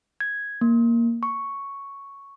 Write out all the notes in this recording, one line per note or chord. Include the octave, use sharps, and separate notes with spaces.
G#6
A#3
C#6